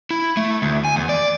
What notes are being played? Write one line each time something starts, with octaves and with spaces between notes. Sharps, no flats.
E4
A3
D2
G#5
E2
D5